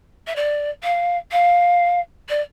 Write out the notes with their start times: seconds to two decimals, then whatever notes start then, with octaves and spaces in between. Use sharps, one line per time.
0.27 E5
0.36 D5
0.83 F5
1.32 F5
2.29 D5